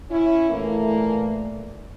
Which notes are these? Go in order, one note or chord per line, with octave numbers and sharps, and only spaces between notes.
C#4 E4
A#2 E3 A3 A#3